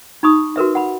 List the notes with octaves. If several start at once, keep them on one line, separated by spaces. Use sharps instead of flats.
D#4 B5 C#6 D#6
F#4 A#4 B4 E5
F#5 B5